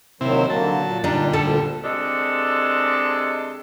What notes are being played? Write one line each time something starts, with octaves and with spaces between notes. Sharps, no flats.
D#2 C3 D#3 F#3 C4 E4
D3 F#3 A#3 A5
A#2
D3 G3 D4 D#4
D2 A#2 A4
C3 G#3 D4 A4